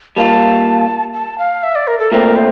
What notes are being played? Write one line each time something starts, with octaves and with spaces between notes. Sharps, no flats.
G3 A#3 F4 A5
A5
F5
E5
D5
A#4
A4
A#2 A3 C4 A#4
C5